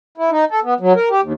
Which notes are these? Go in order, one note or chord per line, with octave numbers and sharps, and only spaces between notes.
E4
D#4
A4
B3
F#3
A#4
G4
D#2